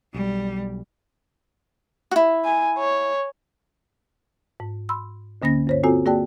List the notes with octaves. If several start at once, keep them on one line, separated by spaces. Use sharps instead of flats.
B1 G3
E4 F#4
G#5
C#5
G#2
B5 C6 E6
D2 D3 A#3 C#4 A#6
G2 C5 C#5
C4 F4 F#4 A4 G#5
A#3 F#4 G#4 D5 G5 A5